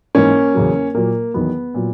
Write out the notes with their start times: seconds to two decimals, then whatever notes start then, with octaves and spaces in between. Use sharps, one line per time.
0.15 G#2 E3 A#3 C#4
0.54 E2 C#3 F#3
0.94 A#2 F#3 A#3
1.34 E2 D#3 F#3 B3
1.74 A#2 F#3